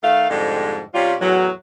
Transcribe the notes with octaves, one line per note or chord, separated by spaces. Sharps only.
D#3 A3 F5
F2 G#2 D3 G3 G#3
C3 G3 C#4 F4
E2 A2 F#3